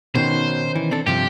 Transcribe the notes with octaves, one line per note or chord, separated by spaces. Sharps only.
B2 D#3 C#4 D#4 C5
E3
C4 D4 A4
G2 C3 F3 G4